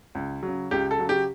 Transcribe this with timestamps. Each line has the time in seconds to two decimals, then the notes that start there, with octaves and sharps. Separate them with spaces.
0.15 C#2
0.43 C#3 F#3
0.71 C#2 G4
0.91 A4
0.99 C#3 F#3
1.09 G4